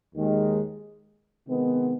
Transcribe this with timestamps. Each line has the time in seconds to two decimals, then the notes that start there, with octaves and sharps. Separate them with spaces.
0.15 D#2 D#3 G#3
1.47 C3 D#3 G#3 B3 D#4